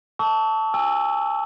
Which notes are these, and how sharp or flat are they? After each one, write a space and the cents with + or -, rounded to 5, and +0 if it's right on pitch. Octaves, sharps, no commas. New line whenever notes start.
A5 +0 C#6 +35 E6 -30
G#5 -40 E6 +0